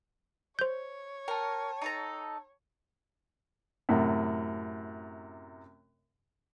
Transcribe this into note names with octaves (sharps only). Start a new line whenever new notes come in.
C5 C#5 G6
A#4 G5 A5
D#4 A4 A#5
F#2 A2 C3